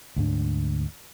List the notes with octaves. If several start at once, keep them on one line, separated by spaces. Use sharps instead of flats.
D2 G#2 D4